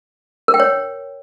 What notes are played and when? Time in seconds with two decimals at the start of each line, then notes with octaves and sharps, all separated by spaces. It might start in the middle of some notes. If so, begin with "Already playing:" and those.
0.48 A#4
0.54 G5
0.60 C#5